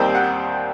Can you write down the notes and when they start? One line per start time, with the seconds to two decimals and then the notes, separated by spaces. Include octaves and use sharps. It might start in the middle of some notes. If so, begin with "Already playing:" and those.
Already playing: D#2 D#3 G3 C4 C5
0.15 F#5